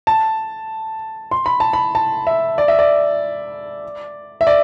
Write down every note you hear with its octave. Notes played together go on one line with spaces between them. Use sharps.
A5
C6
B5
A5
B5
A5
E5
D5
E5
D5
E5
D5